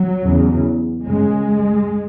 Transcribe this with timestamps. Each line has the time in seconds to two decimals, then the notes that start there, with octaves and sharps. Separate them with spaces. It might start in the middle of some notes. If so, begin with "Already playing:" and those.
Already playing: F#3
0.25 E2 C#3
1.06 F#2 C#3 G#3